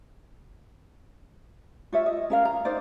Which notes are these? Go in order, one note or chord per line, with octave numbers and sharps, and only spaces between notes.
F4 C#5 E5
D#5
C#4 A#4 F5
A#5
D#4 C5 D5